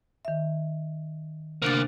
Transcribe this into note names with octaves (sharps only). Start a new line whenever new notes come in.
D#3 E5
D2 C3 A#3 D4 A6